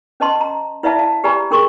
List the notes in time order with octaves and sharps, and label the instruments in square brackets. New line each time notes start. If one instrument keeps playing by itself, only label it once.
[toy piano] C#4 B4 D#5 A5 C6
A#5
E4 B4 D5 E5 F5 A5
D5 F5 A5
G4 B4 D5 G#5 A#5 B5
D4 G#4 A#4 C6 C#6